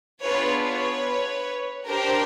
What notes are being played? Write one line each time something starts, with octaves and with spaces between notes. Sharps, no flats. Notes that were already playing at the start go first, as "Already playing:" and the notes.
B3 D4 F4 G#4 B4 C#5
B4 C#5
D4 G4 A#4 C5